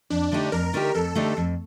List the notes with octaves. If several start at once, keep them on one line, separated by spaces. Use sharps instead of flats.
F2 D4
D3 A3 D#4 G4
F2 A#4
D3 A3 D#4 G4
F2 A4
D3 A3 D#4 G4
F2